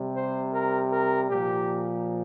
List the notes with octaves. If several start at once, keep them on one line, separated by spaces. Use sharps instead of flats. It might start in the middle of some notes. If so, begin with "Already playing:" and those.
Already playing: C3 G3
C5
A#4
A#4
A#2 F3 G4